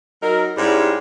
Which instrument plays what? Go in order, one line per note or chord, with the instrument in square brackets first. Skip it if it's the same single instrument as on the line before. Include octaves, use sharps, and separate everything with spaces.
[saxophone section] F#3 D#4 A#4
G#2 G3 C#4 E4 G4